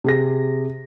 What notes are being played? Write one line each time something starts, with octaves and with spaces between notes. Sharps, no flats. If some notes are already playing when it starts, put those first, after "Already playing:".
C3 G#4 A#6